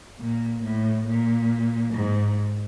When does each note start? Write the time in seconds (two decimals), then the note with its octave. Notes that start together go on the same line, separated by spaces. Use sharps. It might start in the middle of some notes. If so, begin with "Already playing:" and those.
0.20 A#2
0.63 A2
1.07 A#2
1.94 G#2